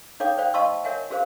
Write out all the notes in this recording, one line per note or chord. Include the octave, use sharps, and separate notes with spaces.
D#4 A4 C#5 F5 G5 D6
C5 D5 F5 G5
D#5 F5 A5 C6 C#6 E6
A#4 C#5 E5 F#5 G#5
F#4 G#4 A#4 C5 F5